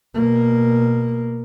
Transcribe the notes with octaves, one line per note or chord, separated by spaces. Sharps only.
B2 A#3